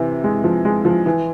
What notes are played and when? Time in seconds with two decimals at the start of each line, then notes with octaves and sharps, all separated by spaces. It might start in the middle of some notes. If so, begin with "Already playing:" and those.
Already playing: C3 E3
0.24 G#3
0.44 F3
0.65 G#3
0.85 F3
1.06 E3